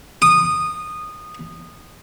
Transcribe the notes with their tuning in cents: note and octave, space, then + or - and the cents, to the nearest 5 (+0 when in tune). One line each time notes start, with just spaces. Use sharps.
D#6 -15